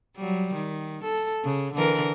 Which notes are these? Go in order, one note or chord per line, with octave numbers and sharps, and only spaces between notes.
F#3 G3
D#3
A4
C#3
D3 E3 A#4